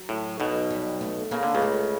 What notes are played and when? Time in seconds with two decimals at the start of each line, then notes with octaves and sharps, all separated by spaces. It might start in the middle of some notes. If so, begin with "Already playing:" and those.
Already playing: F#3
0.09 A2
0.40 B1 B2
0.70 G3
1.01 A3
1.31 C#3 A#3
1.43 D3
1.55 C#2 C#3
1.62 A3